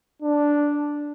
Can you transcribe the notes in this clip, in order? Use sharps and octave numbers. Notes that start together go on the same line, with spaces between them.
D4